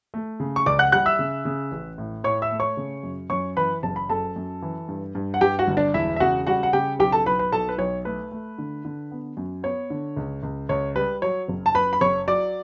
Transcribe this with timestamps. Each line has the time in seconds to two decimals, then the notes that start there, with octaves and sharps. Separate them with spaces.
0.14 A3
0.40 C#3
0.56 C#6
0.66 C#2 D5 D6
0.79 F#5 F#6
0.92 G3 F#5 F#6
1.06 E5 E6
1.19 C#3
1.45 C#3
1.72 A1
1.98 A2
2.24 A2 C#5 C#6
2.42 E5 E6
2.51 A3
2.60 C#5 C#6
2.77 C#3
3.03 F#2
3.30 F#2 C#5 C#6
3.57 E3 B4 B5
3.83 F#1 A5
3.96 B5
4.09 F#2 A4 A5
4.36 F#2
4.62 E3
4.88 G2
5.15 G2
5.34 F#5
5.41 G2 G4 G5
5.59 F#4 F#5
5.68 G1
5.77 D4 D5
5.94 E1 E4 E5
6.16 E5
6.20 C#3 F#4 F#5
6.47 G3 F#4 F#5
6.63 F#5
6.73 C#3 G4 G5
6.99 B1 G4 G5
7.12 A4 A5
7.26 B1 B4 B5
7.39 B4 B5
7.52 B1 A4 A5
7.69 B4
7.78 B1 C#5
8.05 A3 B4
8.32 A3
8.58 D3
8.85 D3
9.11 B3
9.37 F#2
9.63 B3 C#5
9.90 D3
10.17 C#2
10.43 C#2
10.69 C#2 C#5
10.95 G3 B4
11.22 F#3 C#5
11.48 F#1
11.66 A5
11.75 F#2 B4 B5
11.93 B5
12.01 F#1 C#5 C#6
12.28 F#3 D5 D6